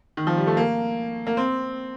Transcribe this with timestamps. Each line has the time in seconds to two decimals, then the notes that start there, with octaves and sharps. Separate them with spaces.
0.17 D#3
0.27 F3
0.37 G3
0.47 A3
0.57 A#3
1.27 A#3
1.37 C4